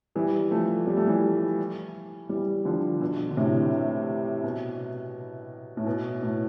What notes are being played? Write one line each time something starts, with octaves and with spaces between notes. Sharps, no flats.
E3 G3
F3 A3
G3
A3
E3 G3
E3 G3
D3 F3
B2 D3
D3
A2 C3
B2
A2
B2
A2